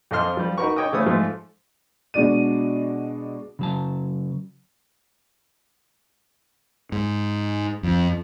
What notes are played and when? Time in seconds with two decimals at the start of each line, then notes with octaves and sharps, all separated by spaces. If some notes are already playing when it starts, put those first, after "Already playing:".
0.11 F2 C4 A4 D#5 C6 F6
0.37 F3 G3
0.58 D#4 F#4 A#4 B4 C#6
0.76 C#5 D#5 G5 D6 D#6
0.92 C#3 E3 A3 C5 C#5 D#6
1.06 G#2 F3 A3
2.14 B2 G#3 D4 F#4 D5 D#7
3.59 C#3 F#3 A5
6.92 G#2
7.83 F2